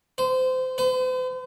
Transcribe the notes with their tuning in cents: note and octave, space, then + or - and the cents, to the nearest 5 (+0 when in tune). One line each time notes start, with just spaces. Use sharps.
C5 -25
C5 -45